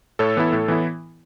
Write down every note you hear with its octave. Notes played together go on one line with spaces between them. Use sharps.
A2 A4 C#5
E3 B3 E4
A2
E3 B3 E4